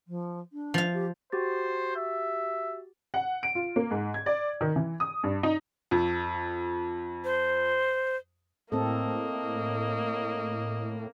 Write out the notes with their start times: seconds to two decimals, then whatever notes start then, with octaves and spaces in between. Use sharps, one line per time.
0.07 F3
0.52 D4
0.74 F3 F5
0.93 G4
1.32 F#4 G4 C5 A6
1.96 E5
3.14 F#5
3.43 D7
3.55 F4
3.76 A#3
3.91 G#2
4.14 G#6
4.26 D5
4.61 D#3
4.76 E3
5.00 D#6
5.24 G2
5.43 D#4
5.91 F2
7.24 C5
8.72 A2 A#3 C4 A4 D#5